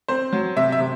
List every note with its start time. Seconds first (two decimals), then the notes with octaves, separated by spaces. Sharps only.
0.08 C4 C5
0.33 F#3
0.56 C3 E5
0.72 E5
0.80 C3